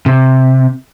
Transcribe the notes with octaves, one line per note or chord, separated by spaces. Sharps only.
C3